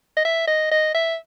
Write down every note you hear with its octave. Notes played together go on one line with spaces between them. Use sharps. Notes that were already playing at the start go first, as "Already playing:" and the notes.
D#5
E5
D#5
D#5
E5